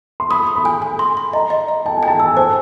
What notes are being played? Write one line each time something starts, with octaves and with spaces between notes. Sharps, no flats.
C6
B5 D#6
D#6
B5
G#5
G#5
C6
C6
D#5 A#5
D#5
D#5
G5 A5
G#5
G5 A5
E6
G#5
C5 A5